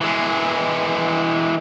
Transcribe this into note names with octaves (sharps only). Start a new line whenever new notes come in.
E3 G#3